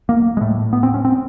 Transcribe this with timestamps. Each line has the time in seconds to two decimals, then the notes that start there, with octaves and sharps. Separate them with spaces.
0.09 A#3
0.37 G#3
0.41 A2 A3
0.73 B3
0.83 C4
0.94 C#4
1.05 C4